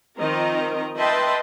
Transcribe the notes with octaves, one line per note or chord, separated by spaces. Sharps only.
D#3 F3 C4 A#4 D#5 A#5
B4 D#5 E5 G5 A5 C6